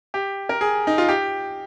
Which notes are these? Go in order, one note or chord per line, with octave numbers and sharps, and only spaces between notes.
G4
A#4
G#4
D#4
F4
G4